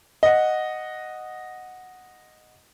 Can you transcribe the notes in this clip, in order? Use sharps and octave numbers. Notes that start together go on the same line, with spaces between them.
D#5 F#5